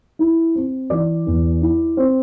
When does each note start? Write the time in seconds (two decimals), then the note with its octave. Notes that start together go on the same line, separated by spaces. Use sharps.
0.19 E4
0.55 C4
0.90 E3 D5
1.26 E2
1.62 E4
1.97 C4